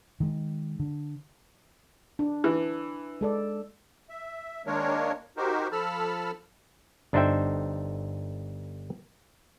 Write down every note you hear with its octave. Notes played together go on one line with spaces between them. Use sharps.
D#3 G#3
D3
D4
E3
G#3 A4 D5
E5
D#3 G#3 A#3 D4 A#4 C#5
D#4 F#4 G4 A#4 C5
F3 A4 A5 B5 E6 F6
G1 D4 D#4 C5 E5 G5